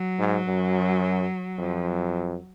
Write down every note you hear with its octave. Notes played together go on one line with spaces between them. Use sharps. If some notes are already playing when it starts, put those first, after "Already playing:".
Already playing: F#3
G#2
F#2
F2 F3
F#3